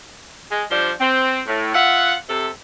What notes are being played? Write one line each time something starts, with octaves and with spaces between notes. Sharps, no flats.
G#3
F3 G3 D4 C5
C4
A2
F4 E5 F#5
C3 A4